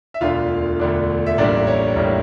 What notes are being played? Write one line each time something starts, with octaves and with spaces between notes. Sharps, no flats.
E5
E1 D2 D3 A3 D4 F4 F5
E1 D2 D3 A3 D4
E5
A1 A2 G3 A#3 D4 D5
C#4 C#5
A1 A2 G3 A#3